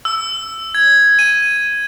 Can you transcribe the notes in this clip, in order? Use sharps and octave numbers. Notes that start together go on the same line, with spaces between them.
E6
G#6
D#7